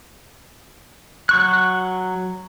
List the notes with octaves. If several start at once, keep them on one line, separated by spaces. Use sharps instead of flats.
F#3 C#6 F#6